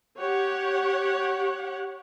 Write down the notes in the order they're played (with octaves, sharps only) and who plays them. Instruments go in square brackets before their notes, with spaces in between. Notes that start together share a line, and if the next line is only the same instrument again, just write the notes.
[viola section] G4 C#5 F#5